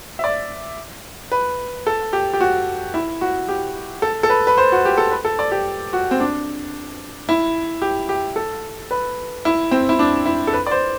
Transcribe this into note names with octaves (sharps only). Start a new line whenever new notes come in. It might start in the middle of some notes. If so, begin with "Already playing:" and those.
E5
D5
B4
A4
G4
G4
F#4
E4
F#4
G4
A4
A4
B4
B4
C5
F#4
G4
A4
B4
A4
D5
G4
F#4
C4
D4
E4
G4
G4
A4
B4
E4
C4
E4
D4
E4
A4
B4
D5
C5